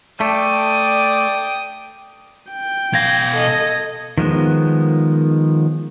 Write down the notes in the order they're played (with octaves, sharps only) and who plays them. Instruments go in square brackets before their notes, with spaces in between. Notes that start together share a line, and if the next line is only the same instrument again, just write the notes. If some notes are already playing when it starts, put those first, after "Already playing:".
[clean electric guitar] A3 [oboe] D5 [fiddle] G5 D#6
[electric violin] G5
[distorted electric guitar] B2 F5 [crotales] G#6 A#6
[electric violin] A4 D#5
[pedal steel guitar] D#3 F3 G#3 B3